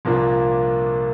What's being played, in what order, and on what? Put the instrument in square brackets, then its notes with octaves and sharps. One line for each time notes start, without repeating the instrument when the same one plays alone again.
[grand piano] C2 A#2 F3 A#3 D4